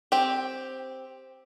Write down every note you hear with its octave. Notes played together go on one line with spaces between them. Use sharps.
C4 G4